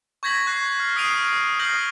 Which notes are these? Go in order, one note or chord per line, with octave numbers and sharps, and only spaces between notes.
C#6 G6 G#6 A#6 B6 F#7
C#6 F#6 A#6 C7
F6
D#6 C7 D7 D#7 F7
D#6 F6 G6 A#6 C7 F#7